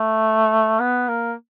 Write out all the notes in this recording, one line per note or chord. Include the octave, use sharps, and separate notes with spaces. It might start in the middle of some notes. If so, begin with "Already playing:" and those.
Already playing: A3
B3
A#3